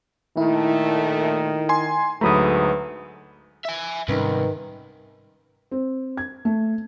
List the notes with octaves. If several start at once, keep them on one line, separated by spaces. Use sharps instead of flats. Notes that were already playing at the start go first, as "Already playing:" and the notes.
A#2 D#3 A3 E4
G#5 C6
D2 G#2 F#3 A3 B4 A#5 B5 D#6
E5 G#5
C2 G#2 D#3 C#4 B4
C4
G#6
A3